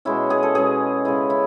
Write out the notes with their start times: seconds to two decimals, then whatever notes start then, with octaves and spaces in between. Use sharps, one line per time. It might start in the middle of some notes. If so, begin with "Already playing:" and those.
0.05 B2 G#3 C#4 E4
0.30 G#4
0.43 A4
0.55 B2 G#3 C#4 G#4
1.05 C#3 G#3 B3 E4
1.30 E4